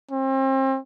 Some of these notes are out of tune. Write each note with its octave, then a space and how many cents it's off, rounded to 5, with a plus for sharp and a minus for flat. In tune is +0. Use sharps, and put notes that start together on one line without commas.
C4 +35